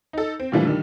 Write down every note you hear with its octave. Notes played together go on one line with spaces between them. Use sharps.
D#4 A4
C4
A#2 D3 E3 F3 G3 A3
D3 D#3 G3